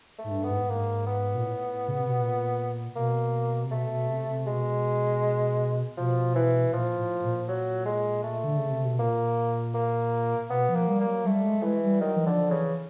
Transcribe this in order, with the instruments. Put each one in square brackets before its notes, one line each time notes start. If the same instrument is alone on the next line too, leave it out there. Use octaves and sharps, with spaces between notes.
[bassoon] A3
[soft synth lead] G#2
G2
[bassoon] B3
[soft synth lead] G#2
[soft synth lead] G#2 [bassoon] A#3
[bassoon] B3
[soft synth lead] A#2
A2
C#3
C3
B2
A#2
[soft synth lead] B2 [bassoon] A#3
[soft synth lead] C3
[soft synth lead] B2 [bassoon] A3
[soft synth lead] B2
C3
C3
[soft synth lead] B2 [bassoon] G#3
[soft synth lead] B2 [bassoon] F3
[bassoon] E3
[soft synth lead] A#2 [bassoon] F3
[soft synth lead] A2
A#2
[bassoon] F#3
G#3
A3
[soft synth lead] D3
C#3
C3
B2
[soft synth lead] A#2 [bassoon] A#3
[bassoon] A#3
[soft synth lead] B2 [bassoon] B3
[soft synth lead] F3
[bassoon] A#3
[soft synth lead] G3
[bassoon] A#3
[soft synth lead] F#3
[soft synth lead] G3 [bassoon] A3
[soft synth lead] G#3
[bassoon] E3 [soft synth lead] G#3
[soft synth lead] G3
[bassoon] D#3 [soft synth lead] F#3
[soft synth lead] E3
[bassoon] D3 [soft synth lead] F3
[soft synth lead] F3
[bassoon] C#3 [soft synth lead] E3